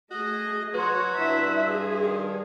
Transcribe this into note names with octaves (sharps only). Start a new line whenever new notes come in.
A3 F#4 G#4 D#5
F#3 F#4 B4 C#5 C6
G2 E4 E5
G#4
D#3